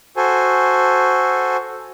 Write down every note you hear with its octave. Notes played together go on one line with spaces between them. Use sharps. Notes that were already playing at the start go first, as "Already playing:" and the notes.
F#4 A4 C5 G#5